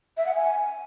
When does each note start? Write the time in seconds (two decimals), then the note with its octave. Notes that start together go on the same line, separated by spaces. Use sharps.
0.17 E5
0.26 F#5
0.35 G#5